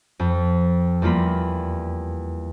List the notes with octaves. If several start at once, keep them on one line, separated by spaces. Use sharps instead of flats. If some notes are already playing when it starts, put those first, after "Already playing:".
F2
E2 G3 A#3 F4 B5